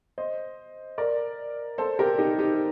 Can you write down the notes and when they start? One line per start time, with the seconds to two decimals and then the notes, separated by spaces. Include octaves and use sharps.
0.18 C5 D#5
0.98 A#4 D5
1.78 A4 C5
1.99 G4 A#4
2.18 D#4 G4
2.39 D#4 G4